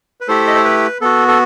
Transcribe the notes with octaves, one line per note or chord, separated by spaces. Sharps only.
B4
A3 E4 G4 A4 C5
D#5
C5
B4
B3 F#4 A4
A4